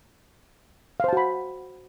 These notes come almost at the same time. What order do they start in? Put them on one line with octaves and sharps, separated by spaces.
F5 C5 A5 F#4 B5